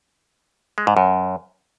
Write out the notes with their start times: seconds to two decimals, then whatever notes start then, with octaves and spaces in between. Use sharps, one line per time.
0.78 G#3
0.87 G#2
0.97 F#2